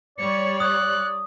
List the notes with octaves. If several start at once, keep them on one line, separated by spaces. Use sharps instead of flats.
G3 C#5 D5 C#7
D#6 F#6